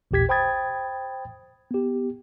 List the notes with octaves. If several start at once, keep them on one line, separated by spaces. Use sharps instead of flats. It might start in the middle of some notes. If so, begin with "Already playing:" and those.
A1 D#2 A#2 G4 G#6 B6
C5 G5 B5 D#6 G#6 A6
B3 G4